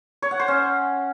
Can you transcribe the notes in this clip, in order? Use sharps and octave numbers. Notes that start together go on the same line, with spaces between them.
C#5
F#5
C5
C#4